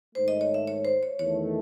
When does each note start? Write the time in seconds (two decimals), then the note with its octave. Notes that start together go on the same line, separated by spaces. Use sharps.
0.14 G#2 D#3 A3 C5
0.28 D#5
0.41 C#5
0.54 E5
0.68 C#5
0.85 C5
1.03 C#5
1.19 E2 D#3 A3 C#5